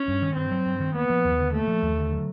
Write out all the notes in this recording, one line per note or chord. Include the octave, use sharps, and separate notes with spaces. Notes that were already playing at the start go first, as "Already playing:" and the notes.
Already playing: C#4
G2
D#3
G2 C4
F#3
G2
D#3
A#3 B3
F3
D#2
D3
A3 A#3
F3
D#2
D3
F#3